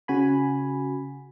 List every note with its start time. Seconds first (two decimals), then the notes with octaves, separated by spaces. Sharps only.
0.08 C#3 F#4 G#5 B5